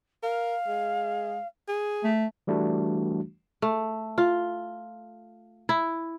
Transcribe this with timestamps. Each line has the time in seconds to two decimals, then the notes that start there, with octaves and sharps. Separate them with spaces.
0.23 A#4 F5
0.67 G#3
1.68 G#4
2.04 A3
2.47 E3 G3 A3 D4 F#4
3.62 A3
4.18 F4
5.69 E4